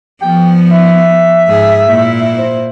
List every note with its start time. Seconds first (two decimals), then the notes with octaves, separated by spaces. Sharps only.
0.22 F3 B3 G5
0.71 E5
1.48 G#2 G#4
1.88 A#2 E4
2.39 C5